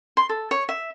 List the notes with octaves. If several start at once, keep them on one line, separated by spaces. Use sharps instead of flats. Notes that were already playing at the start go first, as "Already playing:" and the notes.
C6
A4
C#5
E5